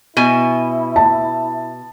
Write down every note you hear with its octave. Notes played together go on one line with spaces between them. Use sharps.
B2 E4 G#5
A5